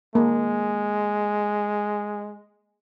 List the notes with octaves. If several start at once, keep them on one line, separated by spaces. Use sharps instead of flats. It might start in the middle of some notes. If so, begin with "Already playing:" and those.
G#3 A#3